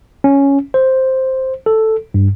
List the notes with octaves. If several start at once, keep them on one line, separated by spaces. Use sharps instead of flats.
C#4
C5
A4
G2